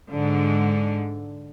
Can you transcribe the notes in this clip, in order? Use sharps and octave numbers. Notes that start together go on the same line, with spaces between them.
G#2 D3